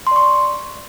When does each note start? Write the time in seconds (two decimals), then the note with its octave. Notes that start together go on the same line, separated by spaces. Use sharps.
0.07 C6
0.11 D5
0.16 C#6